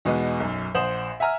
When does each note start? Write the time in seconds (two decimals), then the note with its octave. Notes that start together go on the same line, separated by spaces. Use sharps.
0.05 E2 B2 G#3 B3 D#4
0.40 B1 F#2
0.75 A#1 C5 F#5 D#6 E7 F#7
1.20 E5 F#5 G#5 A#5 F6